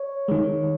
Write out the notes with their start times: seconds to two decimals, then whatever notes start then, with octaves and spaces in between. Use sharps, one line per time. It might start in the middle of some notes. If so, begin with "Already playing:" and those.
Already playing: C#5
0.28 D#3 G#3